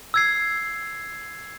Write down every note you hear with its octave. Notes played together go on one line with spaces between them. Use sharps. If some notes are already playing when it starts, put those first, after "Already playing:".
E6 G#6 C7